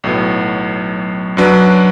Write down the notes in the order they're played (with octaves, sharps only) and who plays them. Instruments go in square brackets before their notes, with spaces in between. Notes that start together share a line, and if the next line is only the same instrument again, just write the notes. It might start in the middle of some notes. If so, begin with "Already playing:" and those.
[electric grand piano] B1 A2 F#3 B3
F#2 F#3 D4 B4